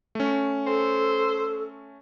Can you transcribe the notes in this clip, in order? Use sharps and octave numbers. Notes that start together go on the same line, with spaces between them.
A3 C#4
A4 C5